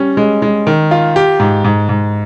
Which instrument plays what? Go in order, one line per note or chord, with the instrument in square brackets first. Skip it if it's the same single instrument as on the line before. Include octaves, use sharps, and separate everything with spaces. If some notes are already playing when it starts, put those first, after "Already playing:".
Already playing: [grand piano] G3 C#4
G#3
G#3
D#3
F4
G4
G#2
G#2
G#2